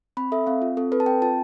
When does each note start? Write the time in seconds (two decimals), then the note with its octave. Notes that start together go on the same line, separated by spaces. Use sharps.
0.17 C4 B5
0.32 A4 E5
0.47 C4 F5
0.62 F4
0.77 C4 A4
0.92 A4 B4
1.00 A5
1.06 C4 G5
1.22 F4 A5